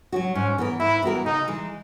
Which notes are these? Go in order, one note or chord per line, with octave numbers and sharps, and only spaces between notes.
F#3 C#4 F#4
G#2 C#4
E3 B3 F#4 A#4
G#2 E4
E3 B3 F#4 A#4
C#3 D#4
E3 G#3